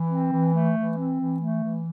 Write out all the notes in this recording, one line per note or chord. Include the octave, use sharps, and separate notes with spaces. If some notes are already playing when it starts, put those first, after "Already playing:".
Already playing: E3
C4
E3
A3
E3
C4
E3
A3
E3